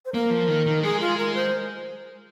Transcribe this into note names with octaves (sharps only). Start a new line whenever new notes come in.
C5
A#3 A#4
F3
D#3
D#3
G#3 G#4
F4
A#4
C5